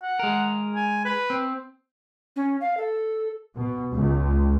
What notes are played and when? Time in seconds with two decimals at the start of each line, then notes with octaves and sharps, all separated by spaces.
0.03 F#5
0.19 G#3 A#4
0.75 G#5
1.05 B4
1.30 C4
2.36 C#4
2.61 F5
2.77 A4
3.56 B2
3.92 C#2